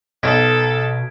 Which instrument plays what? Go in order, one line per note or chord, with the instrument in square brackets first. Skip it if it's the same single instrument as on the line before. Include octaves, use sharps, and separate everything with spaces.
[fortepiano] B1 [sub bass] B2 [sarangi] A4 [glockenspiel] G#6 B6 D7